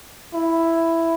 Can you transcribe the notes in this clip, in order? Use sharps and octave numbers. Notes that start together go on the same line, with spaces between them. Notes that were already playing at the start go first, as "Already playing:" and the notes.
E4